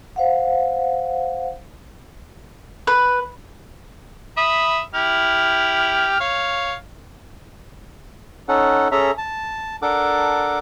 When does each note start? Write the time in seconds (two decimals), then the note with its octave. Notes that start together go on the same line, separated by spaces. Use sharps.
0.16 C5 F5 F#5
2.87 B4
4.37 E5 B5 D#6
4.95 E4 G4 F6
6.20 C#5 F5
8.48 C#4 D#4 A4 F#5
8.92 C#4 G#4 A4 E5 A#5
9.18 A5
9.82 D4 A4 A#4 F#5 D6